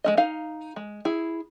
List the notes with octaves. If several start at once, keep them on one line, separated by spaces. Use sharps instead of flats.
G#3 C#4 D#5
D#4 F5
G#3
E4 G#4